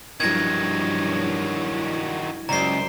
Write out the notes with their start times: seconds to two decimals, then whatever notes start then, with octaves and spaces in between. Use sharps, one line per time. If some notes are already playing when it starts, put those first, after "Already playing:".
0.20 G2 D#3 F3 F#3 E4 G#6 A#6
2.49 C#2 F#2 C5 D5 A#5 C7